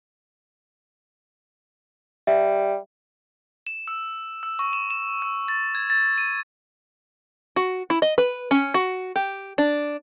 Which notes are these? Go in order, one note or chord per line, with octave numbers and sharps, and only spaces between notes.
G3 E5
E7
E6
E6
C#6
E7
E7
E6
A6
G#6
A6
D#7
F#4
E4
D#5
B4
C#4
F#4
G4
D4